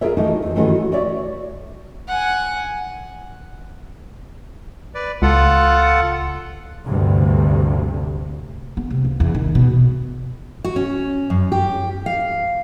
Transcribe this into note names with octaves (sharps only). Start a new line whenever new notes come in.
F4 G#4 A#4 C#5 E5
E3 A3 D#4 F#4
E2
G2 D#3 E3 A3 C#4 F#4
F#4
F#4 C#5 D5 E5
F#5 G#5
B4 D5
C#2 F4 A4 F#5
D2 G2 C3
B3
C3
C#2
E2
D#3
B2
F#4
C#4
F#2
G4
F5